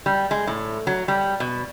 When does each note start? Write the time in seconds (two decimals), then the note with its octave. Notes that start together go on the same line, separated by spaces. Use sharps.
0.06 G3
0.31 G#3
0.47 A2
0.87 F#3
1.08 G3
1.40 B2